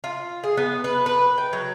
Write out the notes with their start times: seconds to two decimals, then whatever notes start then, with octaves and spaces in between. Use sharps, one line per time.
0.04 F4
0.44 G#4
0.57 B3
0.84 B4
1.06 B4
1.38 G5
1.53 F#3